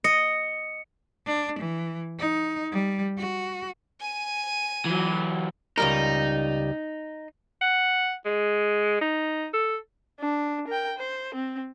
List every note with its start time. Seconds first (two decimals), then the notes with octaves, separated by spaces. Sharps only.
0.04 D#5 C#7
1.26 D4
1.59 E3
2.19 D#4
2.72 G3
3.18 F#4
4.00 G#5 D#7
4.85 E3 F#3
5.78 C#2 G3 D#4 A#4
7.61 F#5
8.25 G#3
9.01 D#4
9.53 A4
10.20 D4
10.68 A#4 G5
10.98 C5
11.35 C4